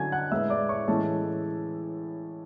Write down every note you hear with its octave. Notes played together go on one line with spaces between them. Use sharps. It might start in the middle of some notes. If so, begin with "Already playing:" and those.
Already playing: D3 F#3 C#4 G#5 G#6
F#5 F#6
A2 G#3 B3 E5 E6
D5 D6
C#5 C#6
A2 E3 G#3 C#4 A4 A5